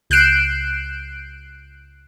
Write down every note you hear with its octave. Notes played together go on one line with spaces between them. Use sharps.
C#2 F#6 G6 C7 D7 E7